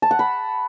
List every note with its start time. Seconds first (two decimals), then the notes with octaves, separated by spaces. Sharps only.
0.02 A5
0.11 F#5
0.19 B5